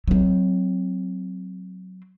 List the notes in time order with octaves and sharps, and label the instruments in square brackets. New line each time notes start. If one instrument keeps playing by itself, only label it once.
[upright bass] F#3 C4